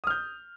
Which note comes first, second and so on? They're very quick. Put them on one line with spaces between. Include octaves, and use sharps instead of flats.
D#6 F6 G6